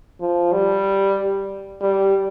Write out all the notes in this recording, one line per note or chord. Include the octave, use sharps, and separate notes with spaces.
F3
G3
G3